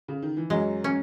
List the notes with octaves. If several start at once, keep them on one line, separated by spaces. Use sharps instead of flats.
C#3
D#3
E3
F#2 F#3 G#3
C#4